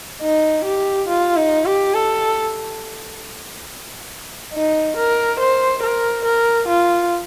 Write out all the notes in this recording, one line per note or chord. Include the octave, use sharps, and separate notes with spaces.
D#4
G4
F4
D#4
G4
A4
D#4
A#4
C5
A#4
A#4
F4